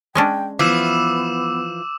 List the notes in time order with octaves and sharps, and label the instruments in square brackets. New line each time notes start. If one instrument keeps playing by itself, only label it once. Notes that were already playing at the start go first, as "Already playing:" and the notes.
[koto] G#3 C#4 D4 [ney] G5
[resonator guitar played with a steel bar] E3 F3 [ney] B3 [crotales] D6 E6 E7